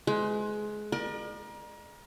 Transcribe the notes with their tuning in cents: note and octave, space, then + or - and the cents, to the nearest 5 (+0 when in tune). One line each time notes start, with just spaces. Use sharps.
G#3 +20 B4 +40
A#4 +30 D5 +45